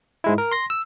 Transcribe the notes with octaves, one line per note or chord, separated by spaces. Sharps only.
G#2 G#3 E4
A#4
C6 A#6
E6